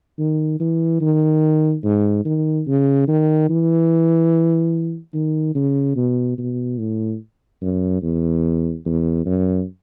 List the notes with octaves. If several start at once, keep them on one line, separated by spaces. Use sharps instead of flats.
D#3
E3
D#3
G#2
D#3
C#3
D#3
E3
D#3
C#3
B2
B2
A2
F#2
E2
E2
F#2